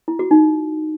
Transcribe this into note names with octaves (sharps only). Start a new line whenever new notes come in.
E4
F#4
D#4